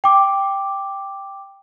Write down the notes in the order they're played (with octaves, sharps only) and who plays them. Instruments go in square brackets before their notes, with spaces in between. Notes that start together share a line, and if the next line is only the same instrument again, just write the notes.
[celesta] G5 D6